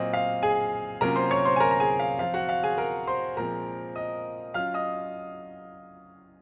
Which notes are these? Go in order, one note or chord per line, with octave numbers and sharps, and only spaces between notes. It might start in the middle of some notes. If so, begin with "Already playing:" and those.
Already playing: A#2 F#3 C4 D#5
F5
G#4 G#5
C3 F#3 A#3 C#4 F4 A#4 A#5
C5 C6
C#5 C#6
C5 C6
G#5
A#4 A#5
A#5
G#4 G#5
F5
F3 C4 F4 F5
F#4 F#5
F5
G#4 G#5
A#4 A#5
C5 C6
A#2 F3 G#3 C4 A#4 A#5
D#5 D#6
F#3 C#4 F4 F5 F6
D#5 D#6